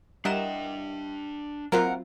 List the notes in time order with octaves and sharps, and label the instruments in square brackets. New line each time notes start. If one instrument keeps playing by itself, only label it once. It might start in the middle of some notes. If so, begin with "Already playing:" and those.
[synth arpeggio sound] G3 A#4 E7 [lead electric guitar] D4 G5 [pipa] E4 D#5 F#5
[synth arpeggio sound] F#3 C4 F4 [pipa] A#3 E4 [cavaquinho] A#4 F#5